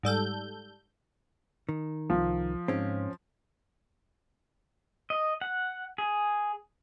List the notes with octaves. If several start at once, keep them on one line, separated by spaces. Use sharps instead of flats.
G#2 G3 A4 G6
D#3
C2 F3
G#2 C4 C#4
D#5
F#5
G#4